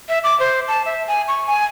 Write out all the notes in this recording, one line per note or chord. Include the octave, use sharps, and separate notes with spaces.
E5
D6
C5
A5
E5
G#5
C#6
G#5